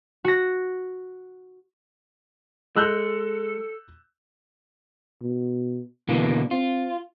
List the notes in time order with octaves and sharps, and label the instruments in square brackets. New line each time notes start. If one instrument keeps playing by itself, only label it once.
[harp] F#4 A#6
[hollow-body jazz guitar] G#3 [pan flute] A4 [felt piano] E6 F#6 G6
[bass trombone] B2
[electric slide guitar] B2 D3 A#3 [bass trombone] E3
[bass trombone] C4 [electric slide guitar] F4